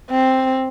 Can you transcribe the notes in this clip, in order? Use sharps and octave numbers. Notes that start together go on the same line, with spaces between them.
C4